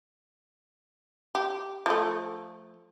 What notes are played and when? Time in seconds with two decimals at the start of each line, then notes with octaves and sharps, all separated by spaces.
1.35 G4
1.86 F3 A3